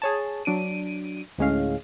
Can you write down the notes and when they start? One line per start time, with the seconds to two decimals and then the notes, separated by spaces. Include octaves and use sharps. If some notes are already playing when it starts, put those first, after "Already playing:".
0.02 G#4 C#5 A5
0.45 F#3 D4 D7 D#7
1.38 D2 A2 G#3 C#4 F5